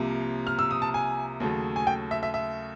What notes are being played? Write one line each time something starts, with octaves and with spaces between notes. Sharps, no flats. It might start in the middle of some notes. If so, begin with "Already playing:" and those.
Already playing: C2 C3 F3 A#3
F6
E6
D#6
A5
G#5
D#2 C#3 F#3 A3
G#5
G5
E5
E5
E5